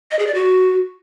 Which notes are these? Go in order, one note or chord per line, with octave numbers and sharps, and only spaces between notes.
D#5
G#4
D5
F#4